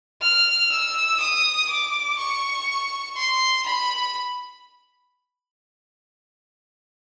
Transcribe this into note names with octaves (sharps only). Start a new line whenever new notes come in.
F6
E6
D#6
D6
C#6
C6
B5